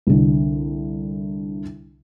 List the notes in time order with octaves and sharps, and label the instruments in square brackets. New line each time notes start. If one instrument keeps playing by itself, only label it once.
[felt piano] C2 D3